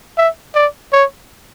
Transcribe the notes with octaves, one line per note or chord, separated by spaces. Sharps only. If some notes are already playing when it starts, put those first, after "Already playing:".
E5
D5
C#5